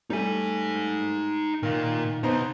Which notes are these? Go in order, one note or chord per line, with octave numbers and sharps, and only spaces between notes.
G3 A3 D#4 G#5
A#2 D#3 F4
B2 B3 D#4 C5 A#5